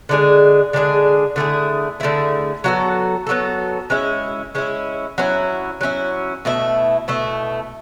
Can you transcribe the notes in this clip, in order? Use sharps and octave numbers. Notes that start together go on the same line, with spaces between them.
D3 G#3 D4 G#4
D3 G#3 D4 G#4
D3 A3 E4 G#4
D3 A3 E4 G#4
F#3 B3 F#4 A4
F#3 B3 F#4 A4
G#3 C#4 E4
G#3 C#4 E4
F#3 C#4 E4
F#3 C#4 E4
B2 A3 E4
B2 A3 E4